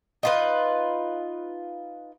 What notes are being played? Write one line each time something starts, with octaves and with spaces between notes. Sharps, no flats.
D#4 F4 B4